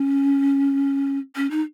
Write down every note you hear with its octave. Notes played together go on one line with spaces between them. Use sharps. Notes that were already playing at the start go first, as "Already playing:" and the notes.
Already playing: C#4
C#4
D#4